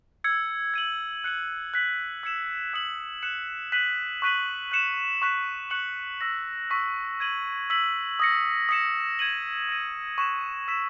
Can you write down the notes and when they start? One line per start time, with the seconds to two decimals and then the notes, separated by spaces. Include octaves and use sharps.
0.24 E6 G#6 C#7
0.74 G#6 D#7 F#7
1.24 F#6 C#7 F#7
1.74 F#6 B6 F#7
2.23 E6 G#6 C#7 E7
2.74 D#6 F#6 C#7 F#7
3.23 F#6 C#7 E7
3.72 F#6 B6 D#7 F#7
4.22 C#6 F#6 B6 D#7 F#7
4.72 F#6 C#7 E7
5.22 C#6 F#6 B6 E7
5.70 C#6 F#6 C#7 F#7
6.21 C#6 E6 A#6
6.70 C#6 E6 B6
7.20 G#6 D#7 F#7
7.70 E6 B6 F#7
8.20 D#6 A#6 C#7
8.69 D#6 A#6 C#7 E7
9.19 G#6 D#7 F#7
9.69 E6 A#6 D#7
10.18 C#6 F#6 B6 E7
10.68 E6 B6 E7